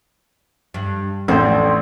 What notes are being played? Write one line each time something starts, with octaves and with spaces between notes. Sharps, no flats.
G2
A1 F2 A2 C4 D4